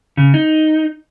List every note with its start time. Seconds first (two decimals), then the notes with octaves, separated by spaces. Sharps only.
0.17 C#3
0.34 D#4